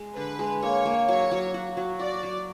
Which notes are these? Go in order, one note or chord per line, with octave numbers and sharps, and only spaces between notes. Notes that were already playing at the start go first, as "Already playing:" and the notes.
Already playing: G#3
D3 B4
G#3
A#3 C#5
A#3
F#3 C#5
F#3
F#4
F#3
F#4 D5
F#3